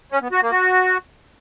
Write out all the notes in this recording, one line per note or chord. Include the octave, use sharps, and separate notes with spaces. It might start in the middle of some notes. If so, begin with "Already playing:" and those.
C#4
B3
F#4
A#3
F#4